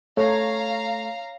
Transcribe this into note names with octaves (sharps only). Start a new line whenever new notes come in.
A3 C#5 F5 A#5